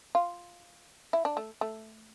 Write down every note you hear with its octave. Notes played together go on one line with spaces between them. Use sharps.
F4
E4
D4
A3
A3